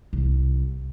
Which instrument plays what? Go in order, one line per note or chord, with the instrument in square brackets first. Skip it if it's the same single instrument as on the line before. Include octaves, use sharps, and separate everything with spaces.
[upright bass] C2